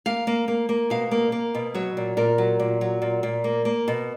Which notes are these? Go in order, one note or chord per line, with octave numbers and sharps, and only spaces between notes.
A#3 F5
A#3
A#3
A#3
B2 F5
A#3
A#3
B2
F#3 C#5
A#2
A#2 A#4
F#3
A#2
F#3
A#2
A#2
A#3
A#3
B2